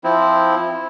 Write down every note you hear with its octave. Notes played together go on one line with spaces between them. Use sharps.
F3 C4 E4